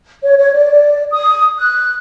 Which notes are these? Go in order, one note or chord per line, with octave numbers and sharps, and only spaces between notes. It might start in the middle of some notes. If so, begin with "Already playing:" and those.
C#5
C#5
D5
D#6
F#6